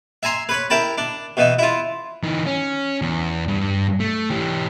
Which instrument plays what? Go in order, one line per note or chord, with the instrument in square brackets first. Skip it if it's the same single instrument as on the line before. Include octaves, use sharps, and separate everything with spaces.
[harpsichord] E5 G#5 A#5 C6
B4 C#5 B5
E4 A#4 G5 A5 B5
D4
B2 E3 D#4
E4 F4
[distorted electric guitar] E3 D#4
C#4
E2
G2
A3
E3 G4